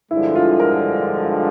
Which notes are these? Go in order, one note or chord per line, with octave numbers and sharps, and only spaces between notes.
G2 D3 F3 G#3 E4
F4
A#4